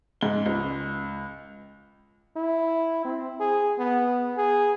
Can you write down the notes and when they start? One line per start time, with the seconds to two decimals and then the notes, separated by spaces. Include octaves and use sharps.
0.21 G#2 G7
0.46 C#2
2.36 E4
3.04 C4
3.40 G#4
3.78 B3
4.37 G#4